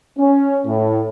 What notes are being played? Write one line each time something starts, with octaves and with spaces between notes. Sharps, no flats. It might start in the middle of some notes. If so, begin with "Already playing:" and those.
C#4
A2